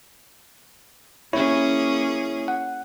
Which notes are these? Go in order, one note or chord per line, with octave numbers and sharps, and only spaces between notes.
A#3 C#4 E4 G#4 C#5
F#5